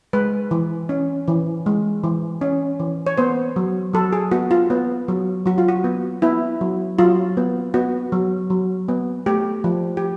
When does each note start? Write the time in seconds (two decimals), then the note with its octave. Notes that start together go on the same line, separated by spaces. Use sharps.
0.13 G#3 B4
0.51 E3
0.89 C#4
1.28 E3
1.66 G#3
2.04 E3
2.41 C#4
2.80 E3
3.07 C#5
3.18 B3 C5
3.56 F#3
3.93 F#3 A4
4.13 G#4
4.32 B3 F#4
4.51 F4
4.70 B3
5.08 F#3
5.46 F#3 F#4
5.58 F4
5.68 F#4
5.84 B3
6.22 B3 E4
6.61 F#3
6.99 F#3 F4
7.37 B3
7.74 B3 F#4
8.12 F#3
8.50 F#3
8.88 B3
9.26 A3 G4
9.64 F3
9.97 G4